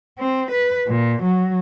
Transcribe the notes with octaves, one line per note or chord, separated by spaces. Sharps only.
C4
B4
A#2
F#3